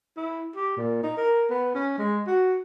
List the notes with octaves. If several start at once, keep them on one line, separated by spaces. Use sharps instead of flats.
E4
G4
A#2
D#4
A#4
B3
C#4
G#3
F#4